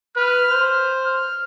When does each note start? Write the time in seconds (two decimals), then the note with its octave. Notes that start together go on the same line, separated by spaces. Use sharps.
0.17 B4 F6
0.49 C5
1.06 F6